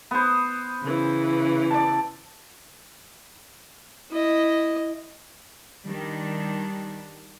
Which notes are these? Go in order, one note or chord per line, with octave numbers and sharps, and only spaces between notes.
B3 C5
C#3 E3
D5 A5
E4 D#5
D#3 G3 D4